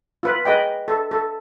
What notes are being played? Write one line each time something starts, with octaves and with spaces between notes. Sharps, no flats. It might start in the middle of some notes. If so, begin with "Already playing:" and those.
F4 B4
G#4 B4 D#5 G5
A4
A4